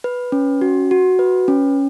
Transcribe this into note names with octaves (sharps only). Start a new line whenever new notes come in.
B4
C#4
F#4
F#4
B4
C#4